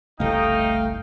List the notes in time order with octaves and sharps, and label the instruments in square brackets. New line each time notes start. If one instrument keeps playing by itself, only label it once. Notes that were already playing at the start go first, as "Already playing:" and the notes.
[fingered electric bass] F#1 C2 [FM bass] A3 [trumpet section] D#4 [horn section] F5 G5